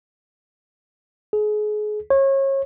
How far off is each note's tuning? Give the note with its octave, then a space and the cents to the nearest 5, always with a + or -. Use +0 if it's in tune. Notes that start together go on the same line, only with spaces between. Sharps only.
G#4 +30
C#5 -30